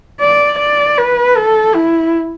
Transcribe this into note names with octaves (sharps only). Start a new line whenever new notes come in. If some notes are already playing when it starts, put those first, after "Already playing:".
D5
D5
B4
A4
E4